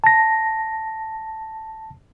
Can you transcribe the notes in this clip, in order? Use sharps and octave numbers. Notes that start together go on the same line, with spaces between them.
A5 A#6